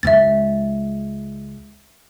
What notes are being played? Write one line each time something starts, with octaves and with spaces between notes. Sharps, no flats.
C#2 G#3 E5 A6